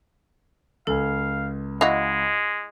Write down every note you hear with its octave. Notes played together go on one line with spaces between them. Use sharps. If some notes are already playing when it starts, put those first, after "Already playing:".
C#2 A4 F5 G#5
G#3 E4 F#4 D#5 F5 F7